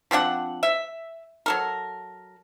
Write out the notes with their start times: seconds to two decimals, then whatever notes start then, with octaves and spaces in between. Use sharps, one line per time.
0.11 F3 C4 D4 F#5
0.63 E5
1.46 F#3 A4 A#4